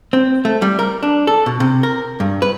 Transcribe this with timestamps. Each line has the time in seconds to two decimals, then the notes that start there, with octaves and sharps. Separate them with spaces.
0.13 C4
0.45 A3
0.62 G3
0.79 A#4
1.03 D4
1.27 A4
1.46 B2
1.60 C3
1.83 A#4
2.20 G2
2.42 B4